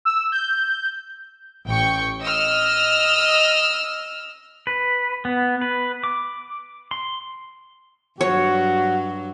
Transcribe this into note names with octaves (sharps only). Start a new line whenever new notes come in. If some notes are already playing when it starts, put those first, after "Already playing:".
E6
G6
A1 G5 C#6
D#5 E6 F6
B4
B3
B4
D6
C6
G2 F#3 F#4 C#5